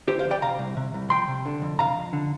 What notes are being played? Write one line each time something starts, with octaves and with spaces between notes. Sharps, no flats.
D3 G4 C5
C5 F5
F2
D5 G5
C3 F5 A#5
C2
C3
C2
F3 G5 C6
C3
D3
F2
C3 F5 A#5
F2
D3